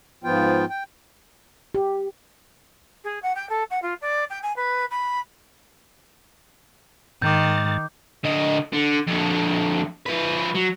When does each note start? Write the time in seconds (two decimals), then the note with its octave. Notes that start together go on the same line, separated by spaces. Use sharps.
0.24 G#2 F3 B3 F4 G5
0.69 G5
1.75 G4
3.04 G#4
3.22 F#5
3.35 G5
3.49 A4
3.70 F#5
3.82 F4
4.01 D5
4.30 G5
4.43 G#5
4.56 B4
4.91 B5
7.22 G#2 D#3 D6 G6 A6
8.24 D3 D#5
8.73 D3
9.07 F2 D3
10.06 F3 B4
10.55 F#3